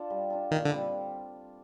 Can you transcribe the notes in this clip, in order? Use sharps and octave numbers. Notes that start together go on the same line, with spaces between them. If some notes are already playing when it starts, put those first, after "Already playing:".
Already playing: D4 F4 A4
G3
D4 F4 A4
A#2 D#3
D3
G3 C4